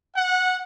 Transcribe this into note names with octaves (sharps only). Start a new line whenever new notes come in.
F#5